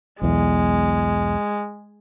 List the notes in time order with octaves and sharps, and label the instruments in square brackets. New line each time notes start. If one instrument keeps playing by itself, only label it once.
[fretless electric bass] B1 E2 [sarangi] G#3